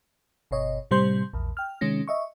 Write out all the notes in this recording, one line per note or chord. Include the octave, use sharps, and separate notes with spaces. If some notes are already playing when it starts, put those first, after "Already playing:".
G1 B2 C#5 D#5
A2 C3 G3 C5 C6 G6
A#1 E2
G5 F6
C3 D#3 G#3 C#4 A#6
D#5 E5 C#6